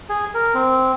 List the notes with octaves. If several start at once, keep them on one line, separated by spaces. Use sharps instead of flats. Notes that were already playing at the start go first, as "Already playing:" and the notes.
G#4
A#4
C4